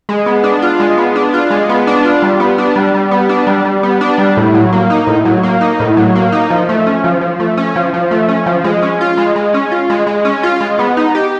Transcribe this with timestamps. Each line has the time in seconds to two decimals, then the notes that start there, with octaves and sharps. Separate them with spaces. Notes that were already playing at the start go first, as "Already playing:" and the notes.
0.09 G#3
0.26 B3
0.44 D4
0.62 F4
0.80 G#3
0.97 B3
1.16 D4
1.34 F4
1.50 G#3
1.69 B3
1.87 D4
2.05 F4
2.22 G3
2.40 B3
2.58 D4
2.76 G3
2.94 G3
3.11 B3
3.29 D4
3.47 G3
3.65 G3
3.83 B3
4.01 D4
4.18 G3
4.37 A2
4.54 F#3
4.72 A#3
4.90 D#4
5.07 A2
5.25 F#3
5.43 A#3
5.61 D#4
5.80 A2
5.97 F#3
6.15 A#3
6.32 D#4
6.50 F3
6.69 A3
6.87 C#4
7.04 F3
7.21 F3
7.40 A3
7.57 C#4
7.76 F3
7.94 F3
8.11 A3
8.28 C#4
8.46 F3
8.64 G#3
8.82 C#4
9.01 F4
9.17 G#3
9.36 G#3
9.54 C#4
9.71 F4
9.90 G#3
10.07 G#3
10.25 C#4
10.43 F4
10.61 G#3
10.79 B3
10.97 D#4
11.15 G4